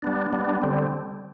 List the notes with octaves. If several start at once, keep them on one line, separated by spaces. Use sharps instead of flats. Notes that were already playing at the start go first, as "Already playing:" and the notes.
G3 B3 D4
G3 B3 D4
D3 G3 C4